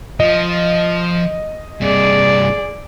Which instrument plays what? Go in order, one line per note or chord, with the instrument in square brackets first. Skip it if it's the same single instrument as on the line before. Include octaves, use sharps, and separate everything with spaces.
[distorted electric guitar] F3 [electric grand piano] D#5
[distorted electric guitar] G2 C3 [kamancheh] G#4 D5